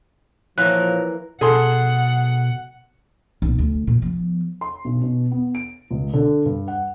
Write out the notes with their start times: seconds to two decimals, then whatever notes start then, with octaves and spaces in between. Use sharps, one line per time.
0.58 A#2 E3 F3 A#3 A#4 B4 C#5 F#6
1.41 B2 G#4 A4 F#5 C6
3.42 B1 A#2
3.59 D2
3.87 A#2
4.02 F3 B3
4.61 C6
4.84 B1
5.02 B2
5.31 B3
5.55 D7
5.91 C#2
6.13 D3
6.45 G2
6.68 F#5